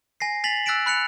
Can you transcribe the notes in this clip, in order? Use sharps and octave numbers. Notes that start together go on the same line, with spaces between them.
G#5 A#6 C7
G#5 A6 B6 F7 F#7
E6 F#6 A6 B6 D7 E7
B5 F#6 C#7 F7